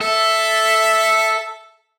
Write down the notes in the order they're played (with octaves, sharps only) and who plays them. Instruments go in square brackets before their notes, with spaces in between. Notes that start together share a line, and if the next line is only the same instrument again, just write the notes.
[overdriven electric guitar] A4 [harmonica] E5